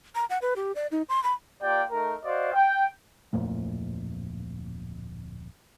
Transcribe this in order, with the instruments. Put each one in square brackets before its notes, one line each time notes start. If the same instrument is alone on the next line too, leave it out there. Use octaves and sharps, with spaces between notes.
[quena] A#5
F#5
B4
G4
D5
D#4
C6
B5
[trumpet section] A#3 F4 G4 D5 G5
A3 D#4 A#4
F#4 C5 D5 D#5 F5
G5
[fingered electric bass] D1 F2 A#2 A3